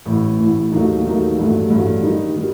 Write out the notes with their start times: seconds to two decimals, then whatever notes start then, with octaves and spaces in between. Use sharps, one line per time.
0.06 A1 A2 E3
0.39 A1 A2 E3
0.71 D#2 D#3 F#3 A3 D#4
1.04 D#2 D#3 F#3 A3 D#4
1.37 A1 G2 F#3 A3
1.70 A1 G2 F#3 A3
2.03 D#3 G3 D#4
2.36 D#3 G3